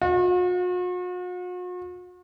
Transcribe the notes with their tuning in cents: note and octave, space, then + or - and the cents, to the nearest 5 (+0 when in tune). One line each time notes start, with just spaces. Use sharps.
F#4 -45